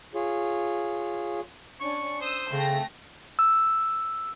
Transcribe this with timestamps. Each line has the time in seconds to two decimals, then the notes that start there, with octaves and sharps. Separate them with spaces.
0.15 F4 G#4 C#5
1.80 C#4 D4 C#6
2.21 C5 D#6 E6
2.52 C#3 A3 C4 A#6
3.39 E6